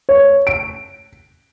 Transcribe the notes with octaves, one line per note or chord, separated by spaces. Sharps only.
C#5
D7